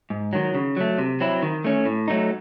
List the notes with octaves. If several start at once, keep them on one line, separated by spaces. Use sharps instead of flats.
G#2
D#3 F#3
C#3
F#3 A3
C3
F#3 C4 E4
D#3
A3 C#4
A2
F#3 A3 D#4